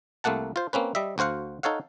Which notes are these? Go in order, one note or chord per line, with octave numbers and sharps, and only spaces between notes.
C2 A3 A#3 F#5 A5
F4 C5
A#3 C4 C#4 B4
G3 D#5 E5
D2 F#4 C5 F5 F#5
D#4 A4 C#5 F5 F#5